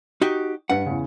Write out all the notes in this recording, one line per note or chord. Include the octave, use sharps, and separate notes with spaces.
D#4 F#4 G4
G2 B4 F#5 C#7
E2 C#3